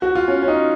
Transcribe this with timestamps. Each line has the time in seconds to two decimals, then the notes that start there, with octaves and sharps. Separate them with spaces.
0.02 F#4
0.15 F4
0.28 C#4
0.42 C#4
0.48 D#4